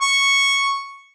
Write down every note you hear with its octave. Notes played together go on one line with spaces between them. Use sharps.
C#6